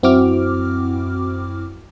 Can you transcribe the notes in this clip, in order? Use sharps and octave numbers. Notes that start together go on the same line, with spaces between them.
F#2 C4 E4 F#4 D6 F6